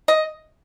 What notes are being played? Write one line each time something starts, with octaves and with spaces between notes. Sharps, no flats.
D#5